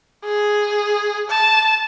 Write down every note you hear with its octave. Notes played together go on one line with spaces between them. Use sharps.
G#4
A5